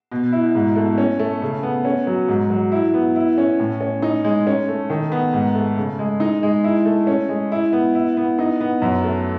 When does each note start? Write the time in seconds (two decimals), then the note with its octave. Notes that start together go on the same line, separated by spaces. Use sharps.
0.12 B2
0.32 E4
0.55 G#2
0.76 A3
0.98 C#4
1.19 A3
1.42 C#3
1.63 B3
1.85 C#4
2.07 F#3
2.28 G#2
2.50 F#3
2.72 E4
2.94 B3
3.16 E4
3.38 C#4
3.60 A2
3.81 C#4
4.02 D#4
4.24 G#3
4.47 C#4
4.68 A3
4.90 D#3
5.12 B3
5.33 G#2
5.55 A3
5.78 C#3
5.99 G#3
6.20 D#4
6.43 G#3
6.64 E4
6.85 A3
7.07 C#4
7.29 G#3
7.52 E4
7.73 B3
7.95 E4
8.17 B3
8.39 D#4
8.61 B3
8.82 F#2
9.04 A3